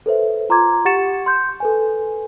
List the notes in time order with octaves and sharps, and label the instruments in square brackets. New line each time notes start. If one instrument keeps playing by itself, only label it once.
[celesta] A4 B4 C5 E5
F4 A#5 C6 D6 G#6
G4 F#5 C#6 A6 C#7 E7
C6 G6
A4 B4 G#5